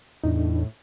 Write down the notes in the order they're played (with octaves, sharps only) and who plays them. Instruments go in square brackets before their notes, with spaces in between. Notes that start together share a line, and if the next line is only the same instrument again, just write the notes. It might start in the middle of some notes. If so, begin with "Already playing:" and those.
[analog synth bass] E2 [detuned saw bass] A2 [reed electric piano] D4 D#4